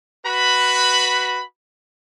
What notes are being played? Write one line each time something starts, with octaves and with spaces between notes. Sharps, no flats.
F#4 B4 B5